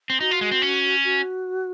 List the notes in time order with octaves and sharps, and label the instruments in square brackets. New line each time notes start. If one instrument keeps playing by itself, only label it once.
[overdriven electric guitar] C4
[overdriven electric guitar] D#4 [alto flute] F#4
[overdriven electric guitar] F4
G#3
C4
C#4
[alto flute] F#4